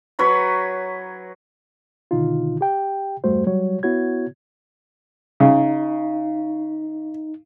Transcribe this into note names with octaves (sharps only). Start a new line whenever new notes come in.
F#3 B4 C#5 B5
B2 D3 D#3 D#4 F4
G4 G5
E2 G2 G3 A3 F#4 C5
F#3 G3 F#4 C#5
B3 E4 F#4 C#5 G#6
C#3 D#4